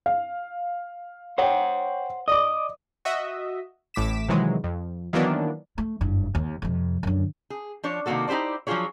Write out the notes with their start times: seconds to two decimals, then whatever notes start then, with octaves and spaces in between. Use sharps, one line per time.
0.06 F5
1.38 C5 C#5 F#5 G5
2.28 D5 D#5 D6
3.05 F#4 D#5 E5
3.94 A1 A2 D6 B6 E7
4.29 C3 D#3 E3 F#3 G#3
4.64 F2
5.13 D#3 E3 F#3 A#3 B3 D4
5.78 A3
6.01 F#1 G2
6.35 D#2
6.62 F2 C3
7.03 F#2 D3
7.50 G#4
7.83 F3 D4 C#5
8.06 C3 D#3 E3 A#3 F#4 A4
8.28 D#4 E4 G4 C5 D5
8.67 F3 F#3 D4 F4 G#4 C#5